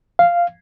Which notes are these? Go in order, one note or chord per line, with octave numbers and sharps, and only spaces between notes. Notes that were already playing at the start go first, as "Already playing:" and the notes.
F5